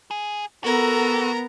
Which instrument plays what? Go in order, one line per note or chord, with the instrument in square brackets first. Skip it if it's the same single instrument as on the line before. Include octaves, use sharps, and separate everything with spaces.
[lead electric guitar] G#4
[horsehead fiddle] B3 [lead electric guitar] F#4 [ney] A4 [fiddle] A#4 A#5